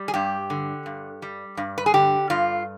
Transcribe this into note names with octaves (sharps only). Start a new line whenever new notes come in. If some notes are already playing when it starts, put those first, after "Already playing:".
Already playing: G3
G#4
G2 G4
D3
G2
G3
G2
B4
G#4
D3 G4
G2 F4